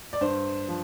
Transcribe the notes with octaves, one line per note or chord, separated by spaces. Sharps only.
D5
G2 C5
F3